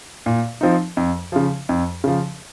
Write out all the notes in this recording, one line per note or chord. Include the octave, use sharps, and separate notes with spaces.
A#2
F3 C4 D#4
F2
C#3 F3
F2
C#3 F3